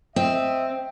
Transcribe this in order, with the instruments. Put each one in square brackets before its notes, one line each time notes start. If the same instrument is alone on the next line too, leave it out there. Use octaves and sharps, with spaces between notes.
[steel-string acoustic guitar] C4 [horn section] D#5 E5